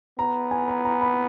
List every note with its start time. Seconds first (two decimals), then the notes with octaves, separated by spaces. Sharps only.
0.19 B3 A#5
0.51 G#5
0.68 A#5
0.85 A#5
1.01 B5